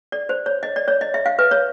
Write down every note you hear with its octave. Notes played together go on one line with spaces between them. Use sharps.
D5
C5
C#5
D#5
D5
C#5
D#5
E5
F5
B4
C#5